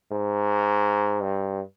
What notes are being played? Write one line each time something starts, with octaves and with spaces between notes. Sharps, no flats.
G#2
G2